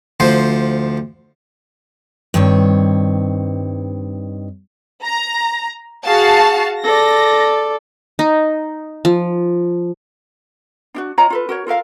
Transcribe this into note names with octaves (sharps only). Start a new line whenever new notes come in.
D2 F3 C5
G2 D#3 C4 C#5
A#5
F#4 G#4 F5 A5
A4 D5 A#6
D#4
F3
D4 E4 F#4
F4 C#5 D#5 A#5
F4 A4 B4
F#4 A#4 C#5
F4 A4 A#4 F5